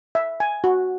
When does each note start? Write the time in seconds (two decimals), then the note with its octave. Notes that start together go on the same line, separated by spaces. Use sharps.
0.15 E5
0.40 G#5
0.64 F#4